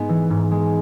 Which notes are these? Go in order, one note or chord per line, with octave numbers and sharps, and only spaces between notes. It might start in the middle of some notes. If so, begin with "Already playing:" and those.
Already playing: G#2 G#3 B3
E3
G#2
G#3